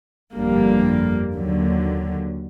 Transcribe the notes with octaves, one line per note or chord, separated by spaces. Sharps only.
G1 F2 D3 G3 A#3
D#2 D3 F#3